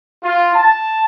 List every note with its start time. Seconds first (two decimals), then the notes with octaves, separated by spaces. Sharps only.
0.23 F4
0.55 A5